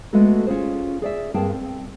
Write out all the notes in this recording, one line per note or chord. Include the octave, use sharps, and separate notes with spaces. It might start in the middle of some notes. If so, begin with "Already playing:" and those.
G#3 A3 B3 F#4 A4
C#4 F4 G#4 C5
G#4 D5 E5
G2 A#3 C4 G#4 G5 A5
C4